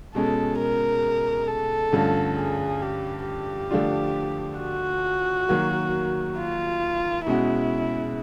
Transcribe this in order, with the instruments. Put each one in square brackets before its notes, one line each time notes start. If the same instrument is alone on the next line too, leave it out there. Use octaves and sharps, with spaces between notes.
[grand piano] B2 G#3 C#4 [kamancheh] A4
[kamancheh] A#4
A4
[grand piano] G2 D3 F3 A3 C#4
[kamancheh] G#4
G4
G4
[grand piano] D3 F3 A3 D4 F4
[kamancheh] F#4
[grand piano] D#3 F#3 A#3
[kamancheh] F4
[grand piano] B2 G#3 C#4 F#4 [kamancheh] E4